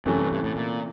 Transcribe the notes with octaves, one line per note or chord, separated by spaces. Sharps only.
F#2 C3 E3 A3 C#4
G2
G2
A2
A#2